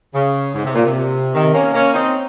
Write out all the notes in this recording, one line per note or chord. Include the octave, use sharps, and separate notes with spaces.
C#3
G#2
C3
A#2
C3
C3 D#3
A#3 C#4
A#3 C#4
C4 D#4